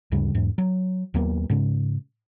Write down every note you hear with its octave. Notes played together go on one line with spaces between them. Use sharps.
D2 G2 C#3 G3
E2 G#2
F#3
D#2 F#3 A#3 B3
G#2 C#3